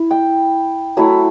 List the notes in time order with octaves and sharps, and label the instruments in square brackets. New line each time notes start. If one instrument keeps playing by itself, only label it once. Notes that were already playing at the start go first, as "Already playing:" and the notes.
Already playing: [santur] E4
G5
F#3 A3 E4